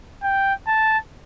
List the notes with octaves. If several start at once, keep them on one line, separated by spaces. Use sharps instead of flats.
G5
A5